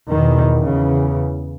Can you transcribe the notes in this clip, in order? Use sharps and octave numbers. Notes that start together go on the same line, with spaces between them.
E2 B2 D#3
E2 C#3